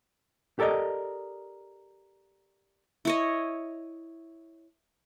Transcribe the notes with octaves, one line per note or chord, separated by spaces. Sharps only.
G4 A4 A#4 D5 D#5
E4 C#5 D#5